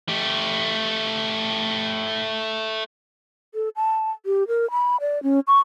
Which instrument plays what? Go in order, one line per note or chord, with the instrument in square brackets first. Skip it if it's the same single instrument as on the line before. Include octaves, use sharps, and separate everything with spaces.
[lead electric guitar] A3 G4
[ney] A4
A5
G4
A#4
B5
D5
C#4
C#6